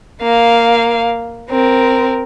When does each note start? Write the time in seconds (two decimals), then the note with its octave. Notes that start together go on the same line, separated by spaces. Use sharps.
0.22 A#3 F5
1.50 C4 A#4